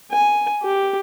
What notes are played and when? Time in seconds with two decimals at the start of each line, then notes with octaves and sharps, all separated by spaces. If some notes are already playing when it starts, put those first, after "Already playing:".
0.12 G#5
0.63 G4